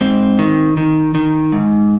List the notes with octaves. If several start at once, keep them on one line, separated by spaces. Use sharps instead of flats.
G#2 C4
D#3
D#3
D#3
G#2